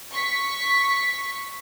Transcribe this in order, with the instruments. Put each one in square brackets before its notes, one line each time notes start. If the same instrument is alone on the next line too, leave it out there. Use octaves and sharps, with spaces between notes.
[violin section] C#6 B6